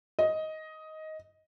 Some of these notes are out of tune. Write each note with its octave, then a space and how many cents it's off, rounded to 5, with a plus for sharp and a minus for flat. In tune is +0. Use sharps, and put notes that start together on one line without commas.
D#5 +10